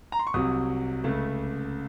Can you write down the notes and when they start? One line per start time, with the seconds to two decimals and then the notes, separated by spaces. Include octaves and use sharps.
0.12 A#5
0.19 C6
0.27 C#6
0.34 C2 C3 F#3 D#6
1.04 C#2 C#3 A3